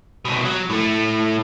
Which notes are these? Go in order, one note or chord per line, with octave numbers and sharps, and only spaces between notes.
C2 B2
F#3
A2 A3